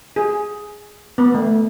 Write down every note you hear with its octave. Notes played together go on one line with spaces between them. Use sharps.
G#4
B3
A3